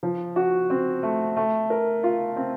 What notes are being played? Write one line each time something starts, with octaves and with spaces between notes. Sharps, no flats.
F3
F#4
C4
A3
A3
A#4
F4
C4